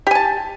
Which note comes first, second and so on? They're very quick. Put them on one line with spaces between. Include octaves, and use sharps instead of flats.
G4 G#5 A5